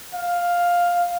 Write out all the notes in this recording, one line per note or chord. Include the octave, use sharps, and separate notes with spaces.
F5